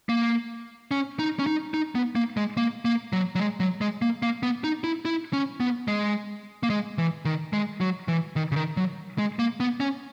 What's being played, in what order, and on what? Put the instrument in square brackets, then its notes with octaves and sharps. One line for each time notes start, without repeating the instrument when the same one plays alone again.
[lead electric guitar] A#3
C#4
D#4
C#4
D#4
D#4
B3
A#3
G#3
A#3
A#3
F#3
F#3
G#3
F#3
G#3
A#3
A#3
B3
D#4
E4
E4
C#4
B3
G#3
A#3
G#3
E3
D#3
G#3
F#3
E3
D#3
C#3
D#3
F#3
G#3
A#3
B3
C#4